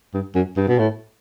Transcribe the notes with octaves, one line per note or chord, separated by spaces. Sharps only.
G2
F#2
G2
B2
A2